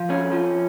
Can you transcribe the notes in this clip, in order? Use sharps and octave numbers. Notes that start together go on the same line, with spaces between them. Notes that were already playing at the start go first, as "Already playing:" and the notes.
Already playing: F3
F2 C#4
F3